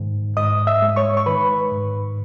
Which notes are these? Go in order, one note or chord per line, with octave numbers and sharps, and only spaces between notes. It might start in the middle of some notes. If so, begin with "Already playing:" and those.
Already playing: G#2 D#3
G#2 D#5 D#6
E5 E6
G#3
C#5 C#6
C#6
D#3 B4 B5
G#2